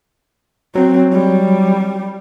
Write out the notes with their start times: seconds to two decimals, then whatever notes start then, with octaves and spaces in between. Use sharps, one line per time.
0.75 F#3 C4
1.13 G3